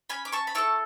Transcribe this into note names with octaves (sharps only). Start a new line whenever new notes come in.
C#4 G#5 B5
D6
A5 C#6
B5
E4 A4 A5 C#6